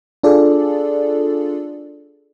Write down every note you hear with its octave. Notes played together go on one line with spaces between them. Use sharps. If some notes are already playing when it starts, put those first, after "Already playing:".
D4 F4 G#4 A4 D5